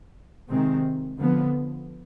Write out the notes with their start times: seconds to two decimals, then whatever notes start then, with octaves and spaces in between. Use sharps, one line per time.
0.49 C3 D#3 G#3 C4
1.18 D3 F3 B3